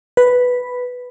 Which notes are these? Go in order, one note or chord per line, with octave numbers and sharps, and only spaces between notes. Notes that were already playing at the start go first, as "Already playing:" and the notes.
B4